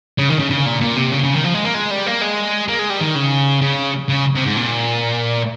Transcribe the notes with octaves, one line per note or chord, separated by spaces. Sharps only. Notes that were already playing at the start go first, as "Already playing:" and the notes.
C#3
D#3
C#3
C#3
A#2
A#2
C3
C#3
C#3
D#3
F3
G#3
A#3
G#3
G3
A#3
G#3
A#3
G#3
G3
D#3
C#3
C#3
C#3
C3
G#2
A#2